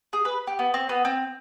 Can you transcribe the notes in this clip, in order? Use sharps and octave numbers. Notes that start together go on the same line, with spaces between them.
G#4
B4
G4
B3
C4
B3
C4